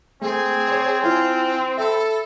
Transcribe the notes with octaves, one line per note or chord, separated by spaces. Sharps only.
A3 C4 G#4
C5 C#5
E4 F4 G#5
A4 E5 B5